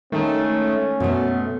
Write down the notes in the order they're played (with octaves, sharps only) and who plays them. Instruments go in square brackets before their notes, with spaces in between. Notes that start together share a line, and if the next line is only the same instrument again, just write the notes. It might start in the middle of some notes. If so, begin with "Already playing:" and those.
[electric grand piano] D#3 G#3 [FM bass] A3 [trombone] C#4
[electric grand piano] F#2 [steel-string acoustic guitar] B2 B3 [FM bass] A3